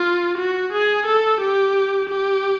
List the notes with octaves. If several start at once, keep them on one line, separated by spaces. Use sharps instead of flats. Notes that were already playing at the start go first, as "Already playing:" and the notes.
Already playing: F4
F#4
G#4
A4
G4
G4